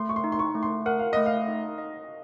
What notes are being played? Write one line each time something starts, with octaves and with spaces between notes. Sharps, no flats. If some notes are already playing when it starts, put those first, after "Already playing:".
Already playing: A3 C6
C#6
C6
D#4
C6
C#6
A3
C6
A#4 F#5
F5
A3 D#5
F5
D#4
D#5